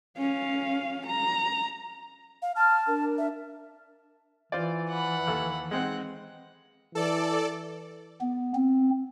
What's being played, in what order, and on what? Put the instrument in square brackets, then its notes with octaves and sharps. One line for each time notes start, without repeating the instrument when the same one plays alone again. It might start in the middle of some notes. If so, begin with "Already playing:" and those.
[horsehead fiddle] C#4 F5
A#5
[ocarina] F5
[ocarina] A5 [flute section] F6
[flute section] D4 A#4
[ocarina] E5
[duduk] E3 [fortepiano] F4 C5 D5
[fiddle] F#5 B5
[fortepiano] D#2 A4
[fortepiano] G#3 C4 D#4 [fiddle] F#5
[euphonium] E3 [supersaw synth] A4 D5
[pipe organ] B3
C4